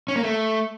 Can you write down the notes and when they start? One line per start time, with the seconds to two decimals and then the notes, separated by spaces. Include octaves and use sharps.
0.08 C#4
0.16 A#3
0.23 A3